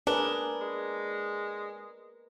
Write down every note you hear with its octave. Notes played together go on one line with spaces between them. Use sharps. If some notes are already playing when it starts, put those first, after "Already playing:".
D4 G#4 A#4 B4
G#3